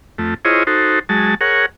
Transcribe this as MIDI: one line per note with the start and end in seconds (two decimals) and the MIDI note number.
0.18 0.34 41
0.18 0.34 57
0.45 0.63 64
0.45 0.63 65
0.45 0.63 68
0.45 0.63 72
0.45 0.63 73
0.45 0.63 75
0.67 0.99 63
0.67 0.99 66
0.67 0.99 69
0.67 0.99 72
1.09 1.35 54
1.09 1.35 56
1.09 1.35 81
1.41 1.66 68
1.41 1.66 70
1.41 1.66 73
1.41 1.66 78